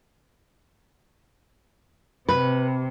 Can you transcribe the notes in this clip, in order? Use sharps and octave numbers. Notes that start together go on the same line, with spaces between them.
C3 B4